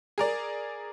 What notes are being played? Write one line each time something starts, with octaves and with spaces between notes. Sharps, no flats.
G#4 A#4 D5